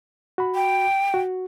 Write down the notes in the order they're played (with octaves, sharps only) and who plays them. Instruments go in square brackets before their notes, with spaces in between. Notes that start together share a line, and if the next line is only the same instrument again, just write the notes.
[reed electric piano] F#4 B5
[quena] G5
[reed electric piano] F#4